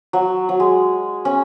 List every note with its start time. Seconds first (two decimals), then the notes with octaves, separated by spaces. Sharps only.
0.13 F#3
0.49 F#3
0.60 G#3
1.25 C#4